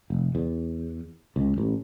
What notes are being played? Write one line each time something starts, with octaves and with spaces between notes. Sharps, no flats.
F1
E2
C#2
A1